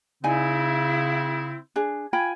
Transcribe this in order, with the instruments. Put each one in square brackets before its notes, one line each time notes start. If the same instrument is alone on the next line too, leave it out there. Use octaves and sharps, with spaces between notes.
[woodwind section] C#3 C4 E4 [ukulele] D#4 D5 G#5
[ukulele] D4 G#4
[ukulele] F4 G5 B5 [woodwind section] G#5